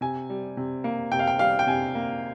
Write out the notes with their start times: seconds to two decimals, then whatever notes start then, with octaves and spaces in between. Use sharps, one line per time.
0.01 C3 G#5
0.30 G3
0.57 C3
0.84 A#3
1.11 C3 G5
1.19 F5
1.27 G5
1.39 G3 F5
1.59 G5
1.67 C3 G#5
1.95 A#3